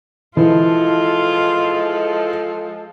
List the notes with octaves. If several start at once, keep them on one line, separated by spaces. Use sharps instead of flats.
E3 F3 G#3 F4 A4